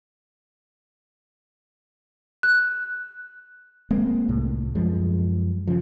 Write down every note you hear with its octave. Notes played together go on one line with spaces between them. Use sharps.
F#6
G#3 A#3 C4
C2 A2
F#2 F3 G#3
C#3 F3